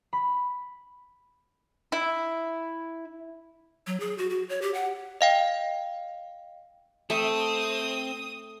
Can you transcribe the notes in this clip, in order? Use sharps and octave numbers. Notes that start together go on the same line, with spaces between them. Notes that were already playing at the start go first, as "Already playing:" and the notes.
B5
E4
F#3
G#4
F#4
F#4
C#5
G4
F#5
D#5 F5 G5
A3 C4 D#6